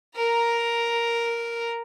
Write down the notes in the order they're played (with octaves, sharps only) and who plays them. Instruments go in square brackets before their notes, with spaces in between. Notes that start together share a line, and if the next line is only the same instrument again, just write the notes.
[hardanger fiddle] A#4 A#5